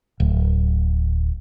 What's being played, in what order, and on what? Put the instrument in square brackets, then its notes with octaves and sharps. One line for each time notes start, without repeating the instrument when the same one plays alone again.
[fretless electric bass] D1